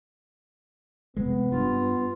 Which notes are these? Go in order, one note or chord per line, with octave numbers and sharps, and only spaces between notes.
F1 C3 G#3 B3
G2 F4